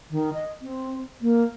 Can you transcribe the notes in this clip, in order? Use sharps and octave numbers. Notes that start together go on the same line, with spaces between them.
D#3
D#5
C4
A#3